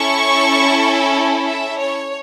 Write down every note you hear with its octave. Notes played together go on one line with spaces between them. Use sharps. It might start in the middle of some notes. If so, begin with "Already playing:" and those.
Already playing: C#4 E4 A4 C#6
E5
C#5